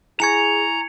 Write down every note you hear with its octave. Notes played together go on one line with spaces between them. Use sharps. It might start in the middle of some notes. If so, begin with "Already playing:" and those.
E4 G#4 G#5 A#5 C#6 G#6 C#7 F7